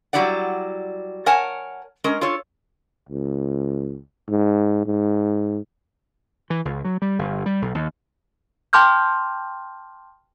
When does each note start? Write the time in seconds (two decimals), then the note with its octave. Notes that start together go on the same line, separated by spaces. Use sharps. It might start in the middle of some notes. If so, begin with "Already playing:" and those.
0.13 F#3 G3 E4 D5 F#5
1.26 A#4 C#5 F#5 G#5 A5
2.04 G#3 C#4 A#4
2.21 F4 A4 C#5
3.09 C#2
4.28 G#2
4.86 G#2
6.50 E3
6.65 C#2
6.85 F#3
7.02 G3
7.19 G1
7.46 G3
7.62 B1
7.75 D#2
8.73 G5 A5 C6 D6 F6 G6